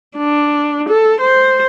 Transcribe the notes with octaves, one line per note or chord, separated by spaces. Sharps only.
D4
A4
C5